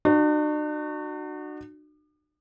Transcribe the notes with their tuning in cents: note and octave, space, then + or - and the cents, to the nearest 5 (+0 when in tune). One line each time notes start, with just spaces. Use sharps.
D4 +45 F#4 +0